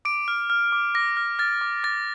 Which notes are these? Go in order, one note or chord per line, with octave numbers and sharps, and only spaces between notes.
D6 D7
F6
F6
D6
D6 A#6
F6
F6 A6
D6
D6 A6